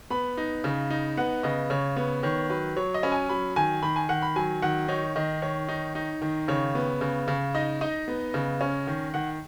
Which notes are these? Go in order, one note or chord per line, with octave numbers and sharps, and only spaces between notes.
B3 B5
D#4
C#3
D#4
B3 F#5
C#3 D#5
C#3 C#5
B3 C#5
D#3 C#5
F#3 B4
F#3 C#5
D#5
C#4 B5
G#5
F#3 B5
D#3 G#5
D#3 B5
G#5
D#3 F#5
B5
F#3 G#5
D#3 F#5
D#4 C#5
D#3 D#5
D#3 C#5
D#4
D#4
D#3
C#3 C#5
B3
C#3
C#3
D#4 D#5
D#4 D#5
B3
C#3
C#4
D#3
D#3 F#5